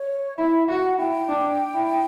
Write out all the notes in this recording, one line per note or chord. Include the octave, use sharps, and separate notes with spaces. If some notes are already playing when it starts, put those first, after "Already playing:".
Already playing: C#5
E4 E5
F#4 F#5
E4 G5
D4
E4